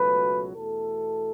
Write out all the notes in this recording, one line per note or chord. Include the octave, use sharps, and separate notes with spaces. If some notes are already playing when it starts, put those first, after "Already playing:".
Already playing: C#2 B2 F#3 A3 B4
E2 B2 A3 A4